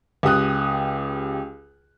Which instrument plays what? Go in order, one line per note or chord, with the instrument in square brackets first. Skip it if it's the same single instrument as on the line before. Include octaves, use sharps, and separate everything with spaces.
[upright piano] C#2 G4 D#6 F#6